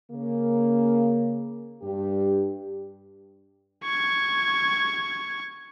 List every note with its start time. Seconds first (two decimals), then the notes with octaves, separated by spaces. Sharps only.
0.11 C#3 A#3
1.82 G2 G4
3.84 C#6 G#6